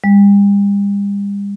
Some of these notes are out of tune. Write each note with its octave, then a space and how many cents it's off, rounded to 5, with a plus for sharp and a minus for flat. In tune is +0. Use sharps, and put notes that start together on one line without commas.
G3 +45